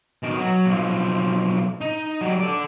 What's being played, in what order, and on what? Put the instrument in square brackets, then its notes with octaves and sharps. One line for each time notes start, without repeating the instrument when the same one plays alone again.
[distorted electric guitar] B2 D#3
F#3
B1 F3
D#4
F#3 G3
A4 D5